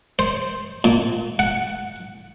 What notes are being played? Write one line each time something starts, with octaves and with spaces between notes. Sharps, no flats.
C5
A#2
F#5